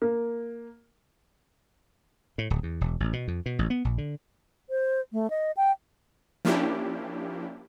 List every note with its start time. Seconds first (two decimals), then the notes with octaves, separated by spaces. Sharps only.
0.02 A#3
2.38 A2
2.50 D1
2.63 E2
2.81 E1
3.00 A1
3.13 B2
3.28 F2
3.46 B2
3.59 A1
3.70 B3
3.85 A#1
3.98 D3
4.70 C5
5.13 A3
5.30 D#5
5.57 G5
6.45 F3 A#3 C#4 D4 E4 G4